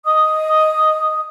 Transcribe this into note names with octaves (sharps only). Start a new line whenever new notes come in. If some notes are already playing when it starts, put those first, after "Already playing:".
D#5 D#6